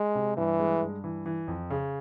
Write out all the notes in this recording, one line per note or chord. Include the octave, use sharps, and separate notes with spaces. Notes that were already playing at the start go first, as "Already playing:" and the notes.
Already playing: G#3
C3
G2 E3
G#3
G2
E3
E3
F2
C#3